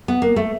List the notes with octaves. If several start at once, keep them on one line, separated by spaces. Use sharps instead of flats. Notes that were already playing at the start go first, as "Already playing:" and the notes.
B3
A#3
A3